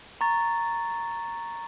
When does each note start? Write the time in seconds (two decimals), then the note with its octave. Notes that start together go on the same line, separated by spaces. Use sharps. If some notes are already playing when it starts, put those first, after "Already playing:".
0.21 A#5 C#6 A6